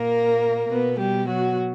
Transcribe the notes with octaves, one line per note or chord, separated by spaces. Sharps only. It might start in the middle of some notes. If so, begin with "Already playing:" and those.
Already playing: A#2 A#3 A#4
B2 B3 B4
G3 G4
F#3 F#4